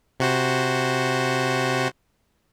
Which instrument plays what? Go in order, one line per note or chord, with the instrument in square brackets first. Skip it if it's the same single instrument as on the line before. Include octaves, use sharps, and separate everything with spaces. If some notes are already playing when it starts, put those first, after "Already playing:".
[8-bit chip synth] C3 F#4 C5